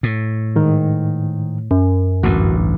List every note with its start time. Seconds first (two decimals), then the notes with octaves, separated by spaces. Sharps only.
0.03 A2
0.56 G#2 D#3
1.71 F#2
2.23 A1 D2 G2 F#4